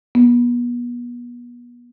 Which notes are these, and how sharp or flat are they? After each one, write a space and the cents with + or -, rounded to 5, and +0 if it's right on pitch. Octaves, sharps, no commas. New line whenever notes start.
B3 -35